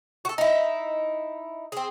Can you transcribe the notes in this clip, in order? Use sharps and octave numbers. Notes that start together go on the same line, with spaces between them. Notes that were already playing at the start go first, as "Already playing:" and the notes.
F#4 A4
D#4 E4
C4 G#4